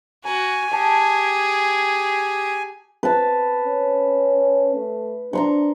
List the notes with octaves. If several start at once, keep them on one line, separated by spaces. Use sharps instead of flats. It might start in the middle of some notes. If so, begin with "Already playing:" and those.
F#4 F#5 G#5 A#5
G4 G#4 F#5 A5
B4 A5
C#4
A3
D4 A#5 C6 C#6